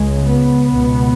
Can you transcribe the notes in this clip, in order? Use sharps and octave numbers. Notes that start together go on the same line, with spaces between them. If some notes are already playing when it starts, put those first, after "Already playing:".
Already playing: C#2 C#3 G#3
B3
C#2 B2